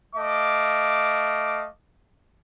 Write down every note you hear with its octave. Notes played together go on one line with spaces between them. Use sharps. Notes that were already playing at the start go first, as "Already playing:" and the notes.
A3 D#5 F5 D6